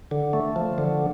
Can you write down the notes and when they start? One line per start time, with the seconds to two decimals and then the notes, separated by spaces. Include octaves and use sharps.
0.11 D3
0.33 A3
0.56 F3
0.78 D3